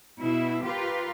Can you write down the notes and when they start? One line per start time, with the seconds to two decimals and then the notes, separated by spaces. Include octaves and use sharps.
0.17 B2 E4
0.63 F4 G4 A#4 B4